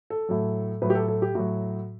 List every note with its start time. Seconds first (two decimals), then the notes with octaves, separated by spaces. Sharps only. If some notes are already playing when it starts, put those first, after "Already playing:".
0.10 A4
0.29 A2 F#3
0.82 A2 F#3 B4
0.90 G4
0.95 A4
1.08 A4
1.22 G4
1.35 A2 F#3 F#4